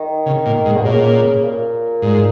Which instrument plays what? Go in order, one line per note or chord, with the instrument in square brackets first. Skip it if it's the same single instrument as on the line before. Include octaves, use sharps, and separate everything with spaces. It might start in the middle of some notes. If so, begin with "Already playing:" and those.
Already playing: [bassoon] D#3
[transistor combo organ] C#3
A#2
G#2
[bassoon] B2
[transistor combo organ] A#2 [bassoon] C#3
[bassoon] A#2
[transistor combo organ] G#2